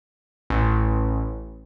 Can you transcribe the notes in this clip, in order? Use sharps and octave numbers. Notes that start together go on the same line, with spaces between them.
A1